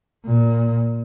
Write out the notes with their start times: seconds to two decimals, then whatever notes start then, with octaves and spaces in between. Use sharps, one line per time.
0.27 A#2